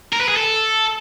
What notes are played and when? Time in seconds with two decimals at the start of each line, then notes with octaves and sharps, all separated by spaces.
0.13 A#4
0.21 B4
0.29 G#4
0.36 A4